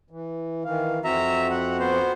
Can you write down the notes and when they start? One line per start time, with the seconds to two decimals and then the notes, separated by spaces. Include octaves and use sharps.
0.11 E3
0.65 D#3 E3 F5
1.04 F2 C4 F#4 E5 A#5
1.51 F#5
1.79 B3 C5